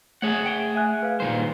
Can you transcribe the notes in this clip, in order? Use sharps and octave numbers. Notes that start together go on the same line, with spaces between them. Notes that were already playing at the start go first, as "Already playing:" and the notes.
A3 G#4 C#5 F#5
G5 D7 G7
E5 G#5 F#6
B4 F5
A#2 D#3 G3 C5